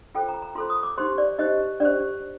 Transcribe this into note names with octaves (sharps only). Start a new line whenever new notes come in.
F4 A4 C5 G5
A#5
A#5
F4 A4 C5 C6
D#6
D6
D#4 G4 C5 C6
D5
D#4 G4 C5 D#5
D4 G4 C5 D5